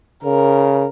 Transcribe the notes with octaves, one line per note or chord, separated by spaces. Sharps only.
C#3 A#4